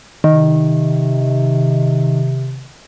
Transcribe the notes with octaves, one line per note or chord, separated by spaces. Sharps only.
C3 D#3